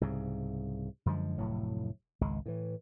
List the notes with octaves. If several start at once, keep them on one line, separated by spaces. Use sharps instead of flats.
C2 G#2 C#3
F#2 D3 F3 G#3
F1 D2 A2 F#3
G#1 C#2 G#3
A2 E3